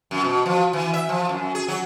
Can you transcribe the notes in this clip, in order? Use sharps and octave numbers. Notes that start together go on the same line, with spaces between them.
F#2
B2
F3
E3
E5
F3
F#2
G#4
F#3